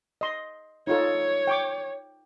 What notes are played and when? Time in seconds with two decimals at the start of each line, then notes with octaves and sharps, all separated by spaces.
0.21 D#5 C6
0.87 D#4 F4 A4 C#5
1.47 G5 C#6 D6